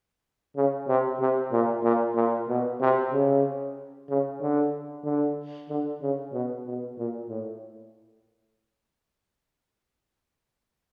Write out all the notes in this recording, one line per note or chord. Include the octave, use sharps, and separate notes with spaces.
C#3
C3
C3
A#2
A#2
A#2
B2
C3
C#3
C#3
D3
D3
D3
C#3
B2
B2
A#2
A2